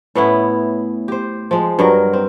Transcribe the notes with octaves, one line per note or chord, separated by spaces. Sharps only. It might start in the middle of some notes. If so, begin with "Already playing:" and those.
A2 B3 C#4 E4
G4 C5
F3 G#3
G2 F#3 A#4
C4